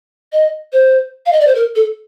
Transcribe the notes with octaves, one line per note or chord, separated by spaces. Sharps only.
D#5
C5
F5
D#5
D5
C5
A#4
A4